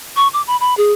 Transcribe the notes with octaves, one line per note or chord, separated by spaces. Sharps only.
C#6
D6
B5
B5
G#4